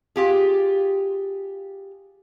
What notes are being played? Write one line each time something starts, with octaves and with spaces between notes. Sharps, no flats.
F4 G4 G#4